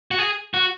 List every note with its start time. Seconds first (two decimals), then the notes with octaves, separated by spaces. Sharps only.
0.11 F#4
0.18 G#4
0.54 F#4